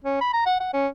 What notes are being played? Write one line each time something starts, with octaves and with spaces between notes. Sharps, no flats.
C#4
B5
A#5
F#5
F#5
C#4